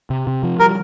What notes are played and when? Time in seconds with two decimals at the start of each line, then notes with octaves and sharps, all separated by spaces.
0.10 C3
0.27 C3
0.43 F3
0.59 G3 A#4